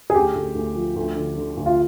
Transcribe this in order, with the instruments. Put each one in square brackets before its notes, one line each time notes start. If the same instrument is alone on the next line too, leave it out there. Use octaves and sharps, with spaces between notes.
[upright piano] G#4
D2 G4
D2
D2
F3
D2
D3
D3
D2
F4